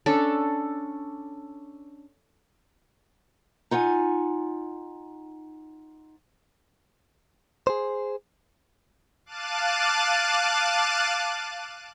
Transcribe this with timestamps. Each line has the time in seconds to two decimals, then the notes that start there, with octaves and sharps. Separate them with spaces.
0.06 C#4 D4 A4
3.71 D#4 F4 F#5 G#5
7.67 G#4 C5
9.26 F5 A5 D6 F#6 A6 D#7